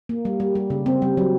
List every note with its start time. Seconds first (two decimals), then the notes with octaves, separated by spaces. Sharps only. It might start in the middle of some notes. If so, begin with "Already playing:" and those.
0.09 A#3
0.25 G3
0.40 G3
0.55 G3
0.70 C#3
0.86 C4
1.02 G3
1.17 F#3